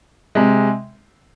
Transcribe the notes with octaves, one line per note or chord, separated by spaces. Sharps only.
C3 G#3